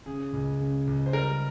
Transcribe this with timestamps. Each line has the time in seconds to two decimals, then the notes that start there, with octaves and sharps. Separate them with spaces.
0.06 C#3 G#4
0.33 C#2
0.60 C#3
0.87 C#2
1.06 C5
1.13 G3 A#4